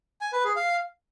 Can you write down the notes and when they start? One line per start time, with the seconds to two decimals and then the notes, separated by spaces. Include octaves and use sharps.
0.21 G#5
0.33 B4
0.44 G#4
0.56 F5